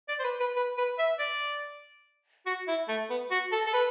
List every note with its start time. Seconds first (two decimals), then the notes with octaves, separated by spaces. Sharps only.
0.09 D5
0.19 C5
0.24 B4
0.40 B4
0.56 B4
0.78 B4
0.99 E5
1.19 D5
2.46 F#4
2.68 E4
2.89 A3
3.10 B3
3.31 F#4
3.52 A4
3.66 A4
3.73 B4